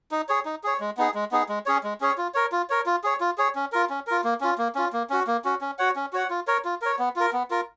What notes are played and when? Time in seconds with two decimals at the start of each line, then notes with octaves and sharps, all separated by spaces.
0.11 D#4
0.29 G#4 C#5
0.45 D#4
0.64 G#4 C#5
0.80 G#3
0.97 B3 D#4 G#4
1.15 G#3
1.32 B3 D#4 G#4
1.49 G#3
1.66 C#4 G#4 C#5
1.84 G#3
2.01 C#4 G#4 C#5
2.18 F4
2.34 A#4 C#5
2.52 F4
2.70 A#4 C#5
2.86 F4
3.04 G#4 C#5
3.21 F4
3.38 G#4 C#5
3.55 C#4
3.72 F4 A#4
3.90 C#4
4.07 F4 A#4
4.24 A#3
4.41 C#4 F4
4.58 A#3
4.75 C#4 F4
4.93 A#3
5.10 C#4 F#4
5.27 A#3
5.45 C#4 F#4
5.61 C#4
5.79 F#4 C#5 F#5
5.96 C#4
6.13 F#4 C#5 F#5
6.30 F4
6.47 A#4 C#5
6.65 F4
6.82 A#4 C#5
6.99 B3
7.16 F4 A#4
7.33 B3
7.51 F4 A#4